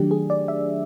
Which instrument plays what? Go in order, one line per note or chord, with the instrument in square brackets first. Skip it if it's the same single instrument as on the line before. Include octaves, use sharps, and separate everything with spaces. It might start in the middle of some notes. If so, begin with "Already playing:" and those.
Already playing: [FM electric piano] D#3 F#3 A3 D4 G4
G#4
D5
E5